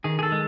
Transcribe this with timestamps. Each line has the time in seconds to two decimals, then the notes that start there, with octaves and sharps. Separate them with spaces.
0.04 D#3 G#4
0.19 G#4
0.23 A4
0.32 G#3